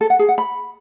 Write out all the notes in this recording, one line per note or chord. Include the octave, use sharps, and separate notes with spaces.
A4
F#5
G#4
F#5
B5